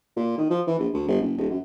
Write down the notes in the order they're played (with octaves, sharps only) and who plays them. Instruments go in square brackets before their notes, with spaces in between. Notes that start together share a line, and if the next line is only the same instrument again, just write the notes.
[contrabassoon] A#2
D#3
F3
E3
A#1
D2
G1
F#1
D#1
F#2